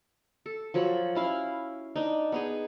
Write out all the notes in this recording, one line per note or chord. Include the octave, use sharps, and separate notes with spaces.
A4
F3 F#3 C#5 B5
C#4 E4 F5
D4 D#4
B3 D#4 G#4